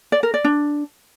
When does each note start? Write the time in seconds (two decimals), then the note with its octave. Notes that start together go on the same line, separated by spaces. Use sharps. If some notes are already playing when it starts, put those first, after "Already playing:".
0.12 D5
0.23 A#4
0.34 D5
0.44 D4